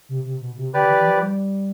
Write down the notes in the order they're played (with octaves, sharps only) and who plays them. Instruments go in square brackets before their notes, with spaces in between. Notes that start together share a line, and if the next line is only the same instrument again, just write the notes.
[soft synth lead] C3
C3
B2
C3
[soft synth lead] D3 [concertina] G4 B4 D5
[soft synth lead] E3
F3
G3